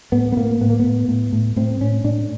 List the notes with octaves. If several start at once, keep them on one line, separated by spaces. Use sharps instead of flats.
A2 B3
B3
A2 A#3
A2 B3
A#3
A2 B3
A2
A2
A2 C4
A2 C#4
A2 D4